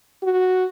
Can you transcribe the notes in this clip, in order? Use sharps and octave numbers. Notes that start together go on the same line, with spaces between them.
F#4